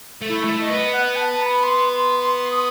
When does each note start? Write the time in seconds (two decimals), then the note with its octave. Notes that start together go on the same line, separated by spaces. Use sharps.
0.22 A3
0.29 E4
0.46 A3
0.61 D#5
0.69 B3
0.93 F#5
1.16 A5
1.33 A5
1.41 B5
1.63 C6
1.88 C6
2.19 C6
2.51 D#6